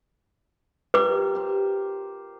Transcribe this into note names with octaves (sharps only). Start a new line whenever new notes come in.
F4 G4 A#4 B4 D6
G4 C5